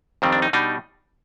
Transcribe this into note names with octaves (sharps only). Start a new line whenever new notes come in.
F2 D#3 G3 C4
D4
D#4
B2 G3 D4 D#4